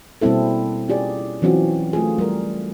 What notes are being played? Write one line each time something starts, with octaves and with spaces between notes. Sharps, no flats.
B2 G3 A#3 C4 E4 A4
C#4 F4 G4 G#4 D5
E4
E3 F#3 C4 C#4 F4 F#4
A3 F4 G#4
G3 A#4